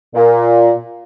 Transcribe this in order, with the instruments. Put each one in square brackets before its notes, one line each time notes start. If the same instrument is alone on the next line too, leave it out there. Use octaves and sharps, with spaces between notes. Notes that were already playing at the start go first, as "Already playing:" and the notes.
[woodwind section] A#2